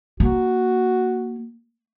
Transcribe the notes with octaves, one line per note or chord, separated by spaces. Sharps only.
A#3 F#4